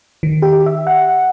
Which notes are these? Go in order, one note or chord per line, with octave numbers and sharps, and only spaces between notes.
D#3
G4
E5
F#5